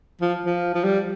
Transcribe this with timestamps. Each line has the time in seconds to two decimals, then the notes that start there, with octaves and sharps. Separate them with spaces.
0.21 F3
0.46 F3
0.75 F3
0.84 G3